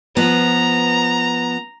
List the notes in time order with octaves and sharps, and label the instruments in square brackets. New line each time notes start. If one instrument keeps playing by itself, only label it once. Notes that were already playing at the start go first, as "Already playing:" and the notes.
[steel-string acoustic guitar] F3 B3 [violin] A#5